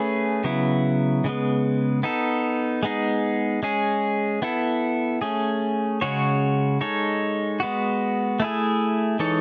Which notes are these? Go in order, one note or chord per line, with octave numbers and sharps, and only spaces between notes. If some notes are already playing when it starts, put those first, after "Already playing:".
Already playing: A3 C#4 G#4 B4
C#3 F#3 B3 E4
C#3 G#3 B3
B3 D#4 A4
G#3 B3 D#4 G#4
G#3 C#4 G#4
B3 E4 A4
A3 C#4 G#4
C#3 G#3 C#4 F#4 C#5
G#3 D#4 A4 C#5
G#3 B3 F#4
A3 E4 G#4
E3 G#3 D#4 A4 C#5